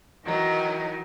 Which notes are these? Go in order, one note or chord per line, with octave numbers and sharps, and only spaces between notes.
D#3 E3 F#3 D#4 E4